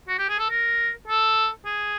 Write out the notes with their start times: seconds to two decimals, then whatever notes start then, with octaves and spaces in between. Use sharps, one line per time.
0.08 F#4
0.18 G4
0.29 G#4
0.39 A4
0.50 A#4
1.08 A4
1.66 G#4